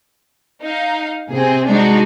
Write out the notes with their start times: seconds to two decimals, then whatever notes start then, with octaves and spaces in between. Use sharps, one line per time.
0.62 D#4 F5
1.32 C3 C4 G#4
1.69 G#3 D4 D#4 F#4